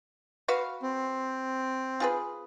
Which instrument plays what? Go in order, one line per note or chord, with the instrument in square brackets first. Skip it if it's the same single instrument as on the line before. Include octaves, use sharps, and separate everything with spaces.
[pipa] F#4 B4 F5
[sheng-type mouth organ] C4
[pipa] F4 G#4 B4